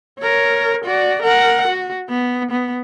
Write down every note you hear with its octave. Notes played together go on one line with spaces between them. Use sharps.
A#4 C#5
F#4 D5
A#4 F#5
F#4
B3
B3